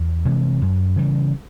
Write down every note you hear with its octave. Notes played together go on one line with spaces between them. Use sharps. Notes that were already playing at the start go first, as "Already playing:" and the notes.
Already playing: E2
C3 E3 G#3
F#2
C#3 E3 G3